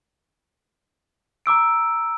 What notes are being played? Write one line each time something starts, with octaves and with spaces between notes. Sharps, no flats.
A#5 D6 E6 D7